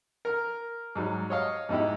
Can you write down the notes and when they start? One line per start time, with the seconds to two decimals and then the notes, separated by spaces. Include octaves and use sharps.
0.25 A#4 F6
0.95 G#2 F#3 G3
1.30 C#5 D#5 F5
1.69 G#2 B2 D#4 E4 G4